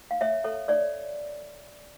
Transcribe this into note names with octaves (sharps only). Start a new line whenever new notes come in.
F5
C#5 E5
A4 C#5
C#5 D5